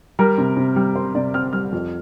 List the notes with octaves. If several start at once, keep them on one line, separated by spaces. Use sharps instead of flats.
G3 A#4
C3
C3
G3
C4 C5
C3 D5
C4 F6
G3 F6
F2